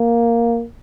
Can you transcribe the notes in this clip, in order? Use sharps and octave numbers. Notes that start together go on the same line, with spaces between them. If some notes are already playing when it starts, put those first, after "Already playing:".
Already playing: A#3